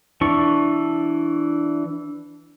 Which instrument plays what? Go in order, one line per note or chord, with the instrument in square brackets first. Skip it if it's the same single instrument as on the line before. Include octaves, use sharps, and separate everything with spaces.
[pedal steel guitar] E3 D4 C#6